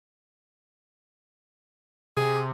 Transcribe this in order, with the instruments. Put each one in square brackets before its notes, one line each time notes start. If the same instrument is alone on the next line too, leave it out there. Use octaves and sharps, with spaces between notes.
[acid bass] C3 [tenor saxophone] G#4